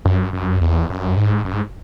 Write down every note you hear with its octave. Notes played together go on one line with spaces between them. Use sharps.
F#2
F#2
E2
F#2
G#2
F#2
G#2